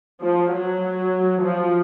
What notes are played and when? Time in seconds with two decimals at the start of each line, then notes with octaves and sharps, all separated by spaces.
0.21 F3
0.52 F#3
1.43 F3